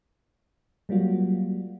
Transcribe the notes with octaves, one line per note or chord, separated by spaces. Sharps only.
F#3 G3 A#3 F4 F#4